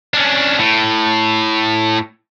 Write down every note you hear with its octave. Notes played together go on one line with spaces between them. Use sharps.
C#4 D4
A2